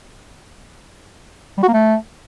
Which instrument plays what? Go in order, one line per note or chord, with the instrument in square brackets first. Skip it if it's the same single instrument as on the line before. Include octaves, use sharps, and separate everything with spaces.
[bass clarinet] G3
F#4
A#3
A3